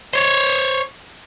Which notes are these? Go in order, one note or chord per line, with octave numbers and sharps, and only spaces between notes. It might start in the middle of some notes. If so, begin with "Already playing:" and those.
C5 C#5